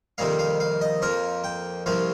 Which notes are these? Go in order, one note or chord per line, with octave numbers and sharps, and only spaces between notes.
F2 C3 D#3 G3 A#3 F5
F5
F5
D#5
F2 F3 A#3 A#4
G5
C2 C3 F3 A#3 F5